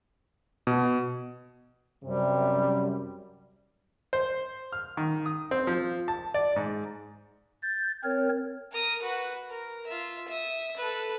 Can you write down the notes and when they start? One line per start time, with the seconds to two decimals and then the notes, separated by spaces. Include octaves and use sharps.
0.67 B2
2.05 F#2 C3 G3
4.13 C5
4.72 F6
4.97 D#3
5.26 D#6
5.51 C4
5.67 F3
6.08 A5
6.34 D5
6.56 G#2
7.62 G6 A6
8.04 C4 A#4 C#5
8.71 A#4 D#6
9.02 F#4 B4
9.50 A#4
9.87 F4 E5
10.29 E5 D#6
10.77 A4 B4